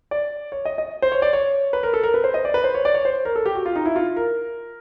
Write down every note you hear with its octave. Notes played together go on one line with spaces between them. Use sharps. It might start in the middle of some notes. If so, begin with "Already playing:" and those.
D5
C#5
D#5
D#5
C5
C#5
D5
C#5
B4
A#4
A4
A#4
B4
C5
D#5
D5
B4
C5
C#5
D5
C#5
C5
A#4
A4
G4
F#4
F4
D#4
E4
F4
A#4